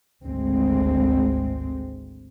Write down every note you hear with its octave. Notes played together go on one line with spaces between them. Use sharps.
G#1 D2 G#3 C4